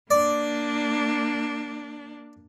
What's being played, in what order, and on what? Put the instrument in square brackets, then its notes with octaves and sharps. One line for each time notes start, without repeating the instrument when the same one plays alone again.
[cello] A#3 D4 [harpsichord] D5